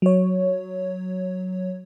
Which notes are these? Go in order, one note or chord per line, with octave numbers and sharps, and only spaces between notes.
F#3 C#5